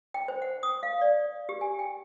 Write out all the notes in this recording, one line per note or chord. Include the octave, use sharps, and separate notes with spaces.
G5
C5
F#5
D#6
F5
D5
G4
G#5
G5